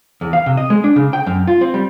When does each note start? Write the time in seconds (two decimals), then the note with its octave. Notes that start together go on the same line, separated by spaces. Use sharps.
0.21 E2
0.33 F5
0.46 C3
0.57 D#5
0.70 G#3
0.84 D4
0.96 C#3
1.13 G5
1.27 F#2
1.47 F4
1.61 C4
1.74 G3